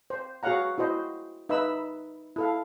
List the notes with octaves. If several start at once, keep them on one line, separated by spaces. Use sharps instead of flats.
C5
F#4 G#4 C#5 F5 F#5 A#5
E4 F#4 C5 D#5
D#4 B4 D#5 E5 B5 E6
E4 A4 F5